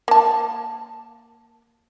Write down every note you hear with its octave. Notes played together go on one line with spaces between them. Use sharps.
A#3 A5